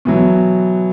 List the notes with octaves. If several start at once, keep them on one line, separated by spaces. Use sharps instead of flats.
B2 E3 F#3